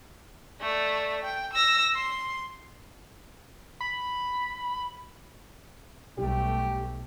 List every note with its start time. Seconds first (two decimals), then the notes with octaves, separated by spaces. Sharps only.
0.61 A3 D5
1.23 G5
1.53 E6 A#6
1.96 C6
3.81 B5
6.19 B1 G3 A3 G4